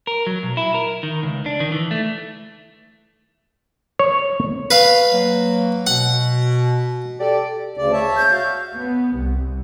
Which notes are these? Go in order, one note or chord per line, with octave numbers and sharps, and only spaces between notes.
A#4
F#3
B1
E4
A#4
D#3
C#2
D4
D#3
E3
A3
C#5
B4 F5
F#3 A#3
B2 F#5
G4 A4 D5
D2 C#3 D5
C#5 E5 A5
G6
F#4 E5 F5
B3
C2